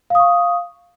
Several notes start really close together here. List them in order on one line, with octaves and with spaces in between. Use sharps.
F5 D#6 C#6